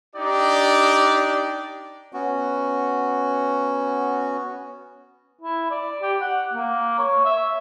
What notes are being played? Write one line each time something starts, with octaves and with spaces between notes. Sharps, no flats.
D4 D#4 G4 D5
B3 C#4 F#4
E4
D5
G4
F#5
A#3
C#5
E5